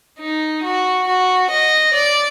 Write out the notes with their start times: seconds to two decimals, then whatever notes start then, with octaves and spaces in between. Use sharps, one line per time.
0.20 D#4
0.64 F#4
1.07 F#4
1.50 D#5
1.93 D5